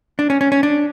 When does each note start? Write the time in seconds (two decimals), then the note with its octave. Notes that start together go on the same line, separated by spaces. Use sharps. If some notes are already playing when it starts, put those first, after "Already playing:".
0.19 D4
0.30 C#4
0.41 C#4
0.52 C#4
0.63 D4